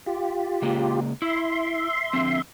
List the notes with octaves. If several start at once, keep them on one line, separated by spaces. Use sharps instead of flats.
F4 G4
C#3 G#3 A#3
E4 E5 C6
D3 F3 C4